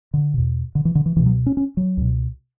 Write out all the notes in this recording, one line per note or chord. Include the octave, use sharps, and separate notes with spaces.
D3
E2 B2
D3
E3
D3
E3
C#2 B2 E3
F#3
C#4
C#4
F#3
C#2 B2